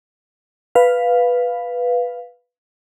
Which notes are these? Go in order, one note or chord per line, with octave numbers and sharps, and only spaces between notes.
B4 F5